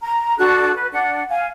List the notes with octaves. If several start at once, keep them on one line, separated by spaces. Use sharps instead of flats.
A#5
D4 F#4 A4 F#6
B4
D4 F#5
F5 G#5